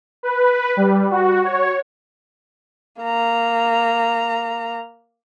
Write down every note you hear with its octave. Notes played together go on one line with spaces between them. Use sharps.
B4
G3
F#4
C#5
A#3 A#5